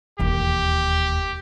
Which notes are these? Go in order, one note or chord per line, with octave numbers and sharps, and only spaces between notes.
E1 D#2 G4